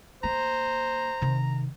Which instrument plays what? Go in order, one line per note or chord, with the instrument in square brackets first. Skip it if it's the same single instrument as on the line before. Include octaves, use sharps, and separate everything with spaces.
[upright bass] A#3 [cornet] C5 [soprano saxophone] A#5
[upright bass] C3 D#3